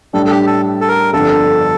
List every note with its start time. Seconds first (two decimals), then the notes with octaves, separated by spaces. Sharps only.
0.13 A2 G3 D4 A4
0.26 A4
0.31 G4
0.47 A4
0.81 A4
0.88 A#4
1.13 G1 F2 D3 A4